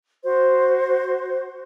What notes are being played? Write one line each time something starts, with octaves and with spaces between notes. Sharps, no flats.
F#4 C5